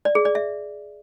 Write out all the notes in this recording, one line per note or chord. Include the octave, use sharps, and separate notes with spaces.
D5
G#4
D5
E5